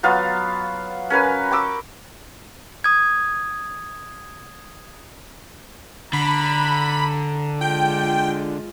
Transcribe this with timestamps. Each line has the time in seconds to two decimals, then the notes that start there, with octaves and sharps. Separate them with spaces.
0.03 F#3 B3 F4 F5
1.10 C#4 A#4 B4 G#5
1.51 G5 C#6 D6 E6
2.84 D#6 G#6
6.13 D3 A#5 B5
7.61 G#3 F4 G5